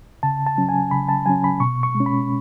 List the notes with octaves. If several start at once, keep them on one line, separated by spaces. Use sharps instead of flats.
C#3 A5
A5
F#3 C#4
G#5
C#3 B5
A5
F#3 C#4 G#5
B5
B2 C#6
C#6
G#3
C#4
B5